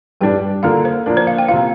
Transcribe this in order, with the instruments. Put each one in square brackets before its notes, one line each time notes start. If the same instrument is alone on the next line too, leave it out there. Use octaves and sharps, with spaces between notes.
[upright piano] G2 G3 D4 G4 [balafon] G5
[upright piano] D3 A#3 F4 A#4 [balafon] F5
[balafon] C5
[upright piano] F3 A#3 D4 [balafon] A#4
[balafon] C5
F5
G5
[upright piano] C3 A#3 F4 [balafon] F5